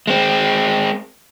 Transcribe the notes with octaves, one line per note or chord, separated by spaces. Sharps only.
G#3 C4